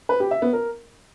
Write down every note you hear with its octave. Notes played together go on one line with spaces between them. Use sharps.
B4
G4
E5
B3
A#4